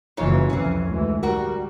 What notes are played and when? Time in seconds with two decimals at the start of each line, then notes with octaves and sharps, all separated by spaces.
0.17 F#1 G#2 E3 F4 C#5
0.50 C2 F2 E3 C4 C#4
0.87 D2 G#2 E3
1.23 G3 F#4 A#4